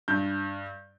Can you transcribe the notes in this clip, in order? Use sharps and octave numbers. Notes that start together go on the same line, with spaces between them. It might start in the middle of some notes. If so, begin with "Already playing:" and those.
G2 G6